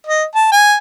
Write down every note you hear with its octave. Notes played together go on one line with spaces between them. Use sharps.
D#5
A5
G#5